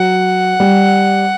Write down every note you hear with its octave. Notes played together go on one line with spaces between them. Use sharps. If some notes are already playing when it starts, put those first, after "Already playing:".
Already playing: F#3 F#5
G3